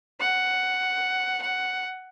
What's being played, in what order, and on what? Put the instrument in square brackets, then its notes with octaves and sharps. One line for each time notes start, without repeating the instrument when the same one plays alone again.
[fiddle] F#5
F#5